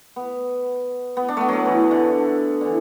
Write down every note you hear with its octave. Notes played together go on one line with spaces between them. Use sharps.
B3
B3
D4
A3 B3
F#3 A3
E3
D3
D3 E3